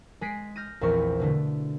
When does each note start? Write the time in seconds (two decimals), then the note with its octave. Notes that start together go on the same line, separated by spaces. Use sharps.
0.21 G#3 G#4 B6 C7 D7
0.56 F6 G6 A#6 D#7
0.81 A#1 E2 C4 A#4 C#6
1.20 B2 D3 A3